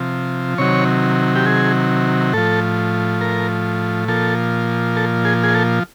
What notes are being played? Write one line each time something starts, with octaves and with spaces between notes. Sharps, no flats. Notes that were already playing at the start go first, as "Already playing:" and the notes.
Already playing: C3 F3
C3 D#3 F#3 C#5
G4
G#4
A2 F3 A4
A#4
A#2 F3 A4
A4
G#4
G#4
A4